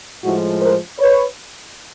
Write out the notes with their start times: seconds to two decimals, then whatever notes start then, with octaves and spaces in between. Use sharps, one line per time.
0.23 A2 F3 G#3 E4 F#4
0.61 A#4 C5
1.00 B4 C#5